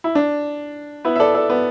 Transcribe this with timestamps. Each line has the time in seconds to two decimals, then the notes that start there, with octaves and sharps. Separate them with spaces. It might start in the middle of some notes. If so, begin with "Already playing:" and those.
0.04 E4
0.15 D4
1.05 B3 E4
1.16 E5
1.20 A4 D5
1.34 A4 D5
1.50 B3